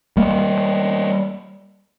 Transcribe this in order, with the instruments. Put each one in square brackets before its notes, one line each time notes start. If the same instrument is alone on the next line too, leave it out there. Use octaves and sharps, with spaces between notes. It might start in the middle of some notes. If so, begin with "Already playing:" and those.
[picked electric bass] G3 A#3